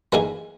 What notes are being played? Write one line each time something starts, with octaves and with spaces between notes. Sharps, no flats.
E3 G3 A#3 D#4 G#4